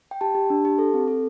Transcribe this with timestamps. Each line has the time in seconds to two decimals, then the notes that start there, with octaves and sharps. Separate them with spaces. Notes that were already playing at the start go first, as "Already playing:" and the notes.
0.11 G5
0.21 G4 A5
0.35 G4
0.50 D4
0.65 G4
0.78 A4
0.94 C4
1.08 A4